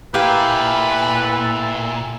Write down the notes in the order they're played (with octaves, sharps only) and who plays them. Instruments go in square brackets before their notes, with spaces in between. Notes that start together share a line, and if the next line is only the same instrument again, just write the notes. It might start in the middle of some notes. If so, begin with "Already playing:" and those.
[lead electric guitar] A#2 [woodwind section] E4 A4 [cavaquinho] G4 F5 G#5 [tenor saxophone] B4